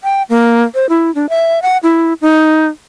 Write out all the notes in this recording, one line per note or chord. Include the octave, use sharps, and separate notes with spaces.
G5
A#3
C5
E4
D4
E5
F#5
E4
D#4